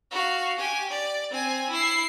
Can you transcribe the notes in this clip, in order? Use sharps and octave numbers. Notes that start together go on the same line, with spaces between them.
F#4 F5
G4 G#5
D5
C4 G#5
E4 C7